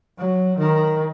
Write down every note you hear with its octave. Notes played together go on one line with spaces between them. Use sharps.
F#3
D#3